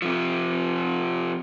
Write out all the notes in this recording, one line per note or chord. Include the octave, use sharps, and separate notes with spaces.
C3 F3